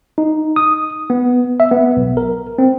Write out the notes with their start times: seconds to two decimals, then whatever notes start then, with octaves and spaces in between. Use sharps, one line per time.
0.18 D#4
0.56 D#6
1.10 B3
1.60 E5
1.71 B3
1.97 B1
2.17 A#4
2.58 C4